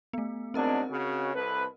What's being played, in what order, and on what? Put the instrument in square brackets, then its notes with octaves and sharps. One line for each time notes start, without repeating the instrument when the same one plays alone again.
[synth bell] A3 B3
[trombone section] G#2 F#3 D4 [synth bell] C4 A#4 D#5
[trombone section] C#3 F#4
C2 A4 B4